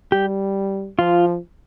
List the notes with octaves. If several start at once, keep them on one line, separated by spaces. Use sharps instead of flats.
G3 G4
F3 F4